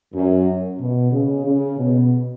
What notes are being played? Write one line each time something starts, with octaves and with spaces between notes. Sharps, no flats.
F#2
B2
C#3
C#3
B2